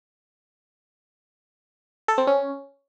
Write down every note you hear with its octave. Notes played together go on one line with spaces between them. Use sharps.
A4
C4
C#4